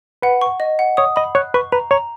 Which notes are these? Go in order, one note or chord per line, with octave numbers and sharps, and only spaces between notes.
B4 F#5
C#6
D#5
F#5
C#5 D#6
D#5 B5
C#5 F#6
B4 C#6
B4 A#5
C#5 A#5